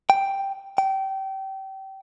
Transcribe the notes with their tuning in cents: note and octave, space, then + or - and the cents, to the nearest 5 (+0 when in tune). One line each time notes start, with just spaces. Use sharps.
G5 +0
G5 -25